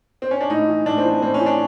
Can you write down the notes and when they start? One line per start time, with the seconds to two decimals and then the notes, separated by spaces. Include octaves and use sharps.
0.22 C4
0.31 C#4
0.41 D4
0.50 A2 D#4
0.68 E3
0.86 A2 D4
0.98 C4
1.04 E3
1.10 C4
1.22 A2 C4
1.34 C#4
1.40 E3
1.46 D4